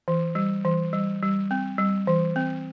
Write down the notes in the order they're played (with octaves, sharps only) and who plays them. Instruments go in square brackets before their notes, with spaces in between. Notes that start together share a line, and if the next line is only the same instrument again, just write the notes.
[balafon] E3
G3
E3
G3
G3
C4
G3
E3
C4